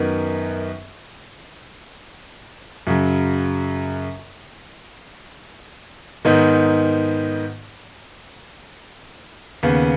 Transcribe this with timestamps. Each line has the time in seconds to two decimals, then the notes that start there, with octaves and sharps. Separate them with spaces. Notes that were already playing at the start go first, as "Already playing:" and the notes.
Already playing: F#2 D#3 B3
2.87 F#2 C#3 F#3
6.25 G#2 D#3 B3 D#4
9.63 D#2 C#3 B3